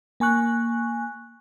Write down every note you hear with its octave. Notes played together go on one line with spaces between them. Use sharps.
A#3 G#5 C#6 F#6